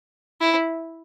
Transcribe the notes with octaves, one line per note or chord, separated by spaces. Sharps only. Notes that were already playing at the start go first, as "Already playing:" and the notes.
E4